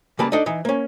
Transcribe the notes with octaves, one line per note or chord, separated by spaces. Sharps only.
C#3 G3 A#3 B4 A5 B5
D4 D#4 A4 D#5
E3 D#4
A#3 C#4